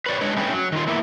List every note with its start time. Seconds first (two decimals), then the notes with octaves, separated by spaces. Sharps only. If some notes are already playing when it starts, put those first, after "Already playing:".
0.06 B4 C#5 D5
0.21 G#3 D4 B4 C#5
0.37 A3 C#4 D#4 G#4 B4 G5
0.52 F#3
0.72 D#3 F4
0.87 A#3 B3 E4